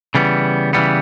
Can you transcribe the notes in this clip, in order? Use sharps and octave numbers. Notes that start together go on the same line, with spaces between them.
C#3 E3 G3 B3
C#3 E3 G3 B3